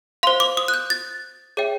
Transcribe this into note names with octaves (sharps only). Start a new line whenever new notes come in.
C5 F5 C6
D6
D#6
F#6
G6
A6
G#4 C#5 E5 G5